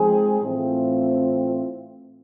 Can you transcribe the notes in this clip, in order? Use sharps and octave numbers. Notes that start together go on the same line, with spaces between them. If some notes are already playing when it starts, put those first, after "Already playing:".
Already playing: F3 G#3 C4 D#4 G#4
A2 E3 A3 C4 F4